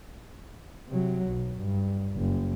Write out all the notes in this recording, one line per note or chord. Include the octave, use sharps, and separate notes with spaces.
C3 F#3
B1
G2
F#1